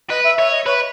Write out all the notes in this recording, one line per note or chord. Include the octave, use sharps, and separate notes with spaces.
B4 D#5
E5
C#5 E5
D#5
B4 C#5